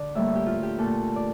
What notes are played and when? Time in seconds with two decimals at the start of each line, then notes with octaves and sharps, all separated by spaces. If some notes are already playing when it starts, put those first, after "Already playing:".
Already playing: D3 D5
0.15 A2 G3 A#3 E5
0.36 G4
0.46 F4
0.63 G4
0.78 A#2 A3 A4
1.16 D5